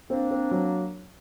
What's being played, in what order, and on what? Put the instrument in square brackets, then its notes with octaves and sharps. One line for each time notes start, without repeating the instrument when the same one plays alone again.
[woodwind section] A#3 D4 [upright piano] C4
[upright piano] C4
F#3